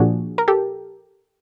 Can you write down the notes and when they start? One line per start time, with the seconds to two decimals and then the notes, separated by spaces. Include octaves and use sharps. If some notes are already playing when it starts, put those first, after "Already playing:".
Already playing: A#2 F3 A#3 D4 F#4 G#4
0.38 A#4
0.48 G4 A4